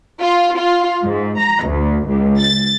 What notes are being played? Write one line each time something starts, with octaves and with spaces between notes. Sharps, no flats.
F4
F4
G#2
A#5
D2
C#2
A6